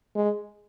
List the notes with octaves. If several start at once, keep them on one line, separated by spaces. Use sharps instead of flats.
G#3